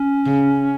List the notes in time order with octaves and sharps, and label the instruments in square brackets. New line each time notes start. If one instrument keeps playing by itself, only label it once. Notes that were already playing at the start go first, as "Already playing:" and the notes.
Already playing: [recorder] C#4
[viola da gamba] C#3